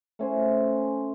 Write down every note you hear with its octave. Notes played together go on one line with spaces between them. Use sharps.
A3 C#4 C5 G#5